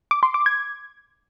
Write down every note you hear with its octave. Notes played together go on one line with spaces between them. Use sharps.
D6
C6
D6
G#6